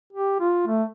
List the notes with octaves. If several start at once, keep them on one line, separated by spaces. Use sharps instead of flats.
G4
F4
A3